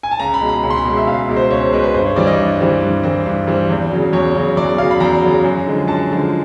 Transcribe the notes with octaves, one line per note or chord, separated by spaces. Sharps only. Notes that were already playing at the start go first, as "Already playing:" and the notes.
G#5
A5
C#2 A#5
B5
B2 G#3
B5
C#2 B5
C6
B5
B2 G#3
E5
C#2 F5
B2 G#3
C5
C#2 C#5
C5
B2 G#3 B4
B4
G2 C5
C#5
E3 G3 C4 D5
D#5
G2
E3 G3 C4
G2
E3 G3 C4
G2
E3 G3 C4
E2
C#3 F#3
E2 C#5
C#3 F#3
E2 D5
C#3 F#3 F5
B5
E2 A#5
C#3 F#3
F#2
D3 F3 G#3
F#2 A5
D3 F3 G#3